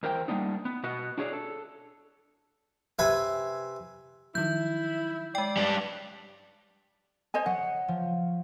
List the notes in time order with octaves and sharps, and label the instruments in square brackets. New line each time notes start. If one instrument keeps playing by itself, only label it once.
[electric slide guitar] E2 A#4 C5 G5
G3 A#3 B3 D4 D#4
B3
B2 F#4 B4 D#5 F#5
D4 F#4 G#4 C#5 D5
A4
[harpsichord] C3 B4 E5 G#5
[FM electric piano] D#3 F3 F#3 [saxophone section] E4 [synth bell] G6
[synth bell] G#3 G5 [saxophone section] D5
[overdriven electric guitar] G3 D4
[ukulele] C5 D#5 G#5
[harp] F#3 [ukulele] F#5
[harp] F3